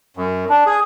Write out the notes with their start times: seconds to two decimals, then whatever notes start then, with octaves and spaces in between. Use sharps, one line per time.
0.17 F#2
0.49 D4
0.66 G#4